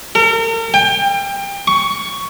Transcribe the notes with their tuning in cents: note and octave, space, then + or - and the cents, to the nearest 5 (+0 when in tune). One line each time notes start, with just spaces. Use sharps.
A#4 -40
G5 +25
C#6 +10